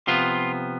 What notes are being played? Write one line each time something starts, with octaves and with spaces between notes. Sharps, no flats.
C3 F3 B3 F4